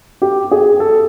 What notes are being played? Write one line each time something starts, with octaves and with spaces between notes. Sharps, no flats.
G4
G#4
A4